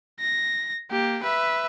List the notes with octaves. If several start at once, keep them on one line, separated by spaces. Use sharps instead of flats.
A#6
A#3 G4
B4 E5